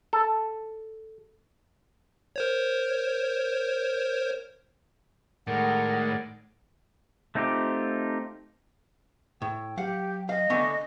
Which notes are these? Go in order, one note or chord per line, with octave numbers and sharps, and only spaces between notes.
A4
A#4 C5 C#5
A2 D#3 G#3 A#4 D5 F#5
A3 C4 D#4 F4 G4
A2 G5
F#3 G4 F5 F#5
D#5 F5
D3 A3 B3 G#5